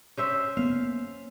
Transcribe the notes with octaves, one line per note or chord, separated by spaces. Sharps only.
C#4 C5 E5
A#3 B3 F5